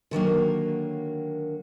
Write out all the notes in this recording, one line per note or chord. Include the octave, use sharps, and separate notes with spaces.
D3 D#3 F#3 A#3